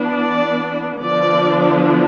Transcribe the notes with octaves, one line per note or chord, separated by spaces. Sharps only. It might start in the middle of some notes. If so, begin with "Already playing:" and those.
Already playing: E3 B3 D4
D5
D3 F3 B3 D4 D5